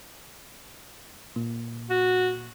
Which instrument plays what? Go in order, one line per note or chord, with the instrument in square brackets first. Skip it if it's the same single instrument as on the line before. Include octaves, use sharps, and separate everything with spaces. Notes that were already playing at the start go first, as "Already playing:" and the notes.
[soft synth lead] A#2
[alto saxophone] F#4